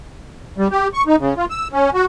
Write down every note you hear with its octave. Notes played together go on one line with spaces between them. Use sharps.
G3
G4
C#6
D#4
C#3
F4
E6
C#4
F#4